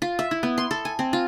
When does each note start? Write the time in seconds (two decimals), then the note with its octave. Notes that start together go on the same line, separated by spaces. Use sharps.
0.02 F4
0.19 E5
0.31 E4
0.43 B3
0.58 C6
0.71 A4
0.85 G#5
0.99 C4
1.13 F4